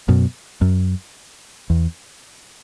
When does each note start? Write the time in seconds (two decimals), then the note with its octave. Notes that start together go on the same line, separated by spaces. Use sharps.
0.08 F#2 B2
0.61 F#2
1.70 E2